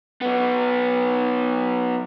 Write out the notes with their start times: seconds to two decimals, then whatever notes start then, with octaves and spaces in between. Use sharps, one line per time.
0.21 F#3 B3